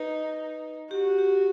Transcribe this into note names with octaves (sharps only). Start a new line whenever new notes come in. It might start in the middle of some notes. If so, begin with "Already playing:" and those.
Already playing: D#4 B4
F#4 G4
G4